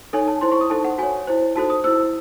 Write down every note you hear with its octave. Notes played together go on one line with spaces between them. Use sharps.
D#4 A4 C#5 G#5
A5
E4 C5 C6
C#6
D#6
D#4 A4 C5 A5
F#5
F#4 C#5 G#5
E4 C5
D#4 F#4 A4 C5 A5
D#6
E4 C5 E6